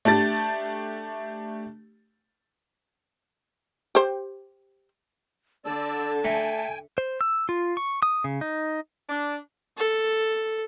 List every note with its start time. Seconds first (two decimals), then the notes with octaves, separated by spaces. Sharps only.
0.05 A3 D4 G4 A6
3.95 G4 C5
5.65 D3 D5 A5 E6
6.24 A3 G5 G#5 A#5
6.98 C5
7.21 E6
7.49 F4
7.77 C#6
8.02 D#6
8.24 C#3
8.41 D#4
9.09 D4
9.77 A4